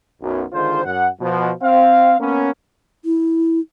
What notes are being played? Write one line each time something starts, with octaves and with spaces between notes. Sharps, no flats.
B1 F#2
D3 D#3 G#3 F4 C5
F#2 F#5
B2 F3
C4 F5
A#3 B3 C#4
E4